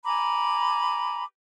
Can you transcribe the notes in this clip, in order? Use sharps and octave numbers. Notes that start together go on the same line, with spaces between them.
G#5 A#5 B5 D6